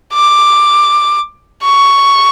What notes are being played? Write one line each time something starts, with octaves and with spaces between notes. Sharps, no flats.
D6
C#6